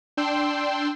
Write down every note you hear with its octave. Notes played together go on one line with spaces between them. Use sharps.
D4 G5 C6 E6 C7